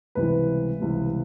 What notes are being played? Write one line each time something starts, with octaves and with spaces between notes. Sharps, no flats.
C#2 C3 E3 G3 B4
C#2 C3 E3 G3